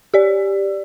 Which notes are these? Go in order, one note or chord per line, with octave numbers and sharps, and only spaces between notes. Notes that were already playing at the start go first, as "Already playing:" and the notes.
G4 D5